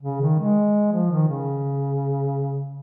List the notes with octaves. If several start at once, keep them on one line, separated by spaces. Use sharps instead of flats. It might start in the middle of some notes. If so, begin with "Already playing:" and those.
C#3
D#3
G#3
F3
D#3
C#3